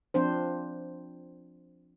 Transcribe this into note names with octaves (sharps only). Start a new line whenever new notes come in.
F3 C4 D4 C5